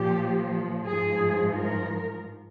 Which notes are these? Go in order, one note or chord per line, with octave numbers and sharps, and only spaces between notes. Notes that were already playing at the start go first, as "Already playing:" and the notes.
Already playing: A#2 F3 G4
G#2 F3 G#4
A#4